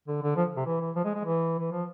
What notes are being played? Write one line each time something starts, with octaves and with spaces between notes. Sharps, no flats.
D3
D3
F3
C3
E3
E3
F3
G#3
G#3
E3
E3
F3